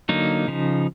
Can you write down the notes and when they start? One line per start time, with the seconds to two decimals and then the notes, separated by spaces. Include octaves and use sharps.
0.09 D3 F#3 A#3 D#4
0.48 C#3 F3